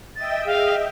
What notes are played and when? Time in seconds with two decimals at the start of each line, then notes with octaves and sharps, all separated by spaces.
0.16 D#5 E5 G5 A6
0.46 G#4 F5